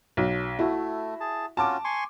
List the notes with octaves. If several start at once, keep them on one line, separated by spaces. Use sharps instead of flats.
B1
A3 E4 F#4
G#4 A5
C#4 F4 F#4 A5 D6
G#5 C6 C#6